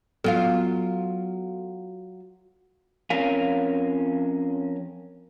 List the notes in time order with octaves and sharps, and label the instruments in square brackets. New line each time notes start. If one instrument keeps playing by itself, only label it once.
[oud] F#3 F4 F5 [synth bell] B3 A4
[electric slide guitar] F2 C#4 A#4 F5 G#5